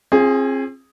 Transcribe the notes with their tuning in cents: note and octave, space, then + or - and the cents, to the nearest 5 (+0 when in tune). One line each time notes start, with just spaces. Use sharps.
C4 +40 F4 +0 G#4 +0